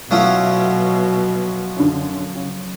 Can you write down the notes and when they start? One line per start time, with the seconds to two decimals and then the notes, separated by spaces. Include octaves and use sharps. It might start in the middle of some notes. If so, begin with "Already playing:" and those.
0.11 B2 F3 F#3 A3 C#4 E4
1.76 F#2 D3
2.35 C#3